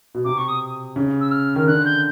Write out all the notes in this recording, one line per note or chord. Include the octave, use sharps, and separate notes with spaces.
B2
C3 D6
C#6
D#6
C#3
E6
F6
D#3
D3 F#6
G6